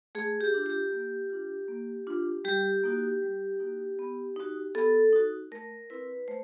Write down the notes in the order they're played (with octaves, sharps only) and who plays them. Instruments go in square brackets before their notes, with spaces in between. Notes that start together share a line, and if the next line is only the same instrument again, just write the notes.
[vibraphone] A3 G#4
G4
D4 F4
G4
A#3
D4 F4
A#3
D4 F4
G3 G4
A#3 D#4 F#4
G3
A#3 D#4 F#4
B3
D#4 F#4
B3 A4
D#4 F#4
A3 A#4
C4 E4 B4
A3 C5